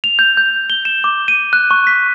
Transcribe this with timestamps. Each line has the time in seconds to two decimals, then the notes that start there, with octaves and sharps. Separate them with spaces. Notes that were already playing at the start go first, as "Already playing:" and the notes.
0.04 F7
0.19 G6
0.37 G6
0.70 G7
0.85 E7
1.04 D6
1.28 D#7
1.53 F#6
1.71 C#6
1.87 B6